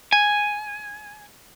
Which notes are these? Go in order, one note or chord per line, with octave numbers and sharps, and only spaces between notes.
G#5